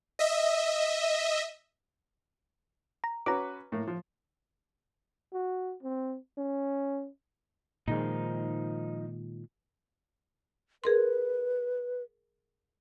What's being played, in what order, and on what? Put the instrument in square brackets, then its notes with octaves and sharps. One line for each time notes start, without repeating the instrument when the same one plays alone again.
[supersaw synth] D#5 E5
[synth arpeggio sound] A#5
[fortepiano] C#4 F#4 B4 [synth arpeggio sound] A#5 D6
[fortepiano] A2 A#3
F3
[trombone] F#4
C4
C#4
[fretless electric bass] A#2 D#3 G#3 [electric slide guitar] F3 D#4
[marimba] G#4 A#4 C6 [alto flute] B4